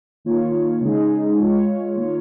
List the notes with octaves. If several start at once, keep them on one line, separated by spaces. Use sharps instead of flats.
D#3 A#3 F4 C#5
C#3 G#3 D#4 G#4
G#3 F4 C#5
D#3 A#3 F4 C#5